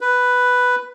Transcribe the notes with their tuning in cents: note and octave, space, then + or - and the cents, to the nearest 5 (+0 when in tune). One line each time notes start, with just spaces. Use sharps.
B4 +5